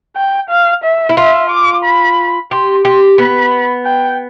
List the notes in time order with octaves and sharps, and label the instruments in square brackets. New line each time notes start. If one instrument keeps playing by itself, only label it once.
[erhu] G5
F5
E5
[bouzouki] E4
[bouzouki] F4 [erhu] E5
[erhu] D6
B5
[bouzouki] G4 [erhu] C6
[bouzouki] G4 [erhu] C6
[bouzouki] B3 [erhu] B5
[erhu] G5